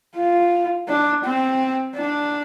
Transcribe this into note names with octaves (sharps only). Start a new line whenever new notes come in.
F4
D4
C4
D4